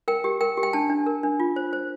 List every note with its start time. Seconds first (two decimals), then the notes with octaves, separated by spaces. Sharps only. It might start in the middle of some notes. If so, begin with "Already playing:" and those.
0.08 A#4 G5
0.24 G4
0.41 A#4 G5
0.57 G4
0.63 G5
0.73 D4 A5
0.90 D4
1.06 A#4
1.23 D4
1.40 F4
1.56 C5
1.73 C5